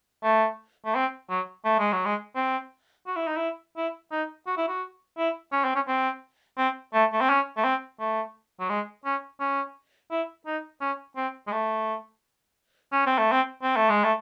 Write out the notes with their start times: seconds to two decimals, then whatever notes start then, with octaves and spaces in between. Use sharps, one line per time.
0.24 A3
0.86 A3
0.95 C4
1.30 F#3
1.65 A3
1.79 G#3
1.93 F#3
2.06 G#3
2.36 C4
3.07 F#4
3.16 E4
3.27 D#4
3.37 E4
3.77 E4
4.12 D#4
4.47 F#4
4.58 E4
4.68 F#4
5.18 E4
5.52 C#4
5.64 C4
5.75 C#4
5.88 C4
6.58 C4
6.94 A3
7.13 A3
7.21 C4
7.30 C#4
7.57 A3
7.64 C4
8.00 A3
8.60 F#3
8.70 G#3
9.05 C#4
9.40 C#4
10.11 E4
10.46 D#4
10.81 C#4
11.17 C4
11.47 G#3
11.52 A3
12.92 C#4
13.06 C4
13.19 A3
13.32 C4
13.63 C4
13.77 A3
13.90 G#3
14.04 A3